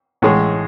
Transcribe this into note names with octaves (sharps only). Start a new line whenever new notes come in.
A1 A2 G#3